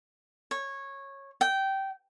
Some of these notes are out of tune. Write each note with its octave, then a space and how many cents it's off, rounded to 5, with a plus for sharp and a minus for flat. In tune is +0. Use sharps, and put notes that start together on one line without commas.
C#5 -15
G5 -15